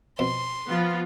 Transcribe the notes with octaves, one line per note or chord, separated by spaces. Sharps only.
F2 B2 C6
F3 B3 F4